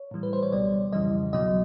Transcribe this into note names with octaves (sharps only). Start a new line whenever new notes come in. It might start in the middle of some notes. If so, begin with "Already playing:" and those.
Already playing: C#5
A2 E3 G3
B4
C5
C#5
C#2 B2 G3 D5
F2 C#3 E3 G3 D#5
C2 B2 F#3 D#5